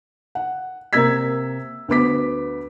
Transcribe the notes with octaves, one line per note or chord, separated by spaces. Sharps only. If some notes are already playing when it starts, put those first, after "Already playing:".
F#5
C3 A#3 A#5 E6 G#6 B6
D2 B3 D6 B6